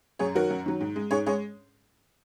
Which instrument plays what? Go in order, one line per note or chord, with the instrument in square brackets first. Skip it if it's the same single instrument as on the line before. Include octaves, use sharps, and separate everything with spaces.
[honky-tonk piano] F#2 G#4 C#5
D#3 F#3 F#4 A#4
F#2
D#3 F#3
G#2
G#3
G#2 G#4 C#5
G#3 G#4 C#5